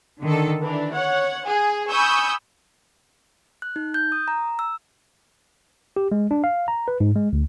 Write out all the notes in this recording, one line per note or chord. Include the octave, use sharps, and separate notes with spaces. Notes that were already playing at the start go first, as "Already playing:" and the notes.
D3 D#3 A4
E3 D4
C#5 F#5
G#4
G#5 B5 C#6 D#6 E6 G6
F#6
D#4
G6
D#6
A#5
E6
G4
G#3
D4
F5
A#5
B4
G#2
G#3
D2